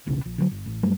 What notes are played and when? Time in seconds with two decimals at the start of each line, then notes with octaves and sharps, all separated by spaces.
0.06 E1 B1 C#3
0.25 A#1
0.38 D3 D#3 F#3
0.51 G1
0.66 A1
0.83 G2 F#3 G3 A3